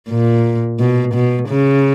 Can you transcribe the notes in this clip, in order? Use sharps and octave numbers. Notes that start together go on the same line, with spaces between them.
A#2
B2
B2
C#3